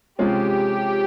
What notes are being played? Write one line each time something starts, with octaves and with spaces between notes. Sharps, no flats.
C3 F3 G#3 C#4 F4 G4